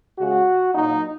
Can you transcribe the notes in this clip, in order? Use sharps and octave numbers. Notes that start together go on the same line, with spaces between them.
C#3 G#3 F#4
A#2 F#3 A#3 D#4